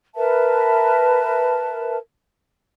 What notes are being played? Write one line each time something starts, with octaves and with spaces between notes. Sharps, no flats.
A#4 B4 E5 A5